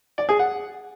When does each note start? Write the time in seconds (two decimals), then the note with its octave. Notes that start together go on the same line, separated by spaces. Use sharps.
0.18 D5
0.29 G#4
0.39 F#5